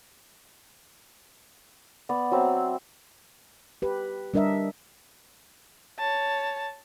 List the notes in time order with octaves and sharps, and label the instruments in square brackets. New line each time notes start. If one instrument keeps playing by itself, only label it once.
[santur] B3 D5
F#3 C4 E5
[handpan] G4 B4
G3 D4 A#4 D#5 E5
[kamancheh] C#5 A5